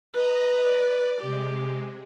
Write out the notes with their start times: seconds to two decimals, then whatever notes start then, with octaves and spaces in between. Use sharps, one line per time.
0.14 B4 D#5 A#5
0.62 D5
1.22 C3 G#3 G4